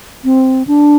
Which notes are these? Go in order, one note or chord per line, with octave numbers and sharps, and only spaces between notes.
C4
D4